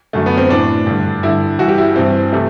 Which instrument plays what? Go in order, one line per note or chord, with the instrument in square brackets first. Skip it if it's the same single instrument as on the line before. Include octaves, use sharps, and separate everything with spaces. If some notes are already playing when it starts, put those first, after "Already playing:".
[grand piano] F#2 D3 A3
B3
C4
A2 E3 D4
G2 D3
G2 D3 E4
G2 E3 F#4
G4
E4
G2 E3 C4
C3 E3 A3